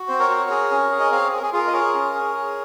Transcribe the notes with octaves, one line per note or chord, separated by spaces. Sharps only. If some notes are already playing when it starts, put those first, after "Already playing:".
Already playing: F#4
C4 C5
A#4 C#5
F#4
G#4
C#4
G#4
D#5
C4 C#5 F5
G#4
A#4
G#4
F4 G#4
A#4
D#5
G#4 A#4 C#5
C#4
G#4
G#4